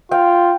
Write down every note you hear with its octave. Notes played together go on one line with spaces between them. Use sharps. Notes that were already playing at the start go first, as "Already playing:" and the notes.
F4 F5 G5